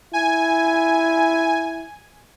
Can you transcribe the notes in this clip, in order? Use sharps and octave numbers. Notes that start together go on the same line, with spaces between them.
E4 G#5